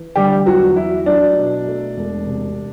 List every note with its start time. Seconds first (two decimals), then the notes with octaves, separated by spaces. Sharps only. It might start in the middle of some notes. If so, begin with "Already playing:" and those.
Already playing: E3
0.16 D3 G3 G4
0.46 E2 F#3 F#4
0.76 F#3 E4
1.06 F#3 D4
1.36 B2
1.67 A3
1.97 E1
2.27 C3